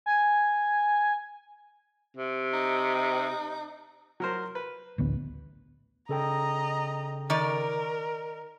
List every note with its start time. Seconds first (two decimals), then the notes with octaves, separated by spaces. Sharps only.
0.06 G#5
2.17 C3
2.53 D#4
4.20 F#3 A#4 C5
4.55 B4
4.98 A1 D2 B3
6.09 C#3 A4 D#5 G5 A#5
7.30 D#3 A#4 D5